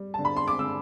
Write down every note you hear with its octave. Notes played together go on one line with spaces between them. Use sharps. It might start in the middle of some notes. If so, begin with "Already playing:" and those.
Already playing: G3
D3 A5
B5
C6
D6
D3 E6